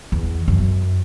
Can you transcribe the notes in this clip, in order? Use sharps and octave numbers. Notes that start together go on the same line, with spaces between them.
E2
F#2